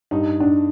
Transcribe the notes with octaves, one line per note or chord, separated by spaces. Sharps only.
G2 D#4
D4